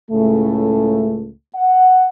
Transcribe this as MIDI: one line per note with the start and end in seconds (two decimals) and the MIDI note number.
0.11 1.30 37
0.11 1.30 45
0.11 1.30 49
0.11 1.30 57
1.56 2.07 78